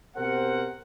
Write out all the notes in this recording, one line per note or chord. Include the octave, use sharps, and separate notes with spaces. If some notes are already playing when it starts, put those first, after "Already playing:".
B2 C4 G4 A#4 C5 F#5